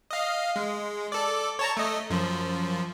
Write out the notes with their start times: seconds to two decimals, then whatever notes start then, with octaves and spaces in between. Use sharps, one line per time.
0.11 D#5 F5
0.56 G#3
1.12 A4 D5
1.59 C#5 A5 A#5
1.77 A3 D#5
2.10 F#2 F3